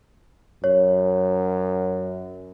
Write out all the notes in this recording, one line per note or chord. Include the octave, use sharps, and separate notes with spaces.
F#2 C#5